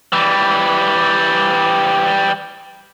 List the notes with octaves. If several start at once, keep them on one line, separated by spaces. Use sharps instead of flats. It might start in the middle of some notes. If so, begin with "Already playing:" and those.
E3 G3